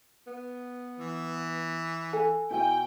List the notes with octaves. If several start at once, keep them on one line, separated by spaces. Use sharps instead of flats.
B3
E3
A4 F#5 G#5
B2 E4 G5 G#5